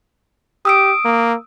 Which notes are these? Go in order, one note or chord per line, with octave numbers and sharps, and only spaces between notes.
G4 D#6 E6 D7
A#3